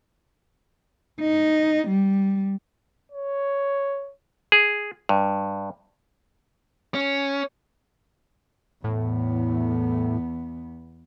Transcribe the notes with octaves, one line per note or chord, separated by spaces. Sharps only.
D#4
G3
C#5
G#4
G2
C#4
E2 A2 B3